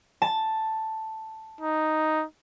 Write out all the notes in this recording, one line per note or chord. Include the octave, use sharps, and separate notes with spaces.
A5
D#4